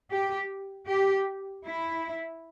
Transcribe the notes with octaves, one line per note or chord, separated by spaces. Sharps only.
G4
G4
E4